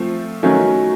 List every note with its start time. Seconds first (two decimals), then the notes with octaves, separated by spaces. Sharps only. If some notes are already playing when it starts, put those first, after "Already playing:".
Already playing: F3 A3 C4
0.43 D#3 F#3 A3 C#4